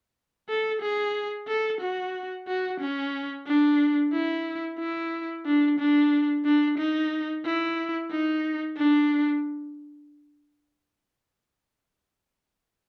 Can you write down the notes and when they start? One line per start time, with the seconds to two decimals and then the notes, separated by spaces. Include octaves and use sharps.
0.49 A4
0.82 G#4
1.48 A4
1.81 F#4
2.48 F#4
2.81 C#4
3.47 D4
4.13 E4
4.79 E4
5.46 D4
5.79 D4
6.45 D4
6.78 D#4
7.45 E4
8.11 D#4
8.77 D4